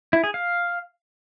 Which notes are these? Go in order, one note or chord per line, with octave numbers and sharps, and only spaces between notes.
E4
G#4
F5